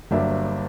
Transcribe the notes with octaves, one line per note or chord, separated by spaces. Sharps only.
G1 G2 F#3 A#3 D4 E5